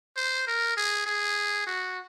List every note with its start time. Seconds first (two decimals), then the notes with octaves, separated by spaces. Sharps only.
0.17 C5
0.47 A#4
0.77 G#4
1.06 G#4
1.67 F#4